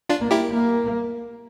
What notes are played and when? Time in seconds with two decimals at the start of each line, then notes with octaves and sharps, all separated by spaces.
0.09 D4 F4
0.21 A#3
0.31 E4 G4
0.52 A#3